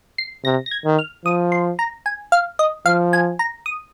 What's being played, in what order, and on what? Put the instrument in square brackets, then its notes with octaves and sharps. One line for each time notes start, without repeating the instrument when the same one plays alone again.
[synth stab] C7
[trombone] C3 [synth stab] A#6
[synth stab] A#6
G#6
[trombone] D#3
[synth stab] F6
[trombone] F3 [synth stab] D#6
[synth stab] C6
A#5
G#5
F5
D#5
[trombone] F3 [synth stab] F5
[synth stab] G#5
A#5
D#6